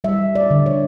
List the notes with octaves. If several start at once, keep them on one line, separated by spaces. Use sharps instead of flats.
G3 E5
D5
D3
C#5